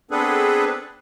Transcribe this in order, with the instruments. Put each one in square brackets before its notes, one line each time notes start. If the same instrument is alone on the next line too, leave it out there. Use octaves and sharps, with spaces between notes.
[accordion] B3 C4 D4 G#4 A4 B4